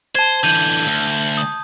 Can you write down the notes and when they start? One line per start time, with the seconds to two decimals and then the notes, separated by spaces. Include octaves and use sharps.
0.15 C5 A5 G#6
0.43 D3 E3 G6 D#7
0.87 D2
1.37 D#6